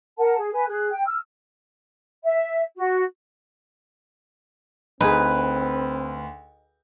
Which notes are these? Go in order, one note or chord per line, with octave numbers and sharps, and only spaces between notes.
A#4 F#5 A5
G#4
B4 G#5
G#4 F#6
G5
E6 F6
E5
F#4
D2 C4 D#4 G#4 B4